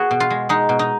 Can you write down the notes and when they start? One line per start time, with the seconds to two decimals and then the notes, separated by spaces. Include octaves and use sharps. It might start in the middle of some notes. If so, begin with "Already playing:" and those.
Already playing: B3 F#4 G#4
0.11 B2
0.20 F4
0.30 G#3
0.49 G#3 D#4
0.69 B2
0.79 D#4